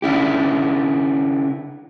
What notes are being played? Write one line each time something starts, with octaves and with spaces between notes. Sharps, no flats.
C#3 D4 E4 G4